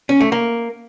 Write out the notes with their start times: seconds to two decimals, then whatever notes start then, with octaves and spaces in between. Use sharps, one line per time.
0.09 C#4
0.21 A3
0.32 A#3